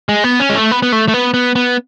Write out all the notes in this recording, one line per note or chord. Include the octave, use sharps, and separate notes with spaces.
G#3
B3
C#4
G#3
A3
B3
B3
A3
A3
B3
B3
B3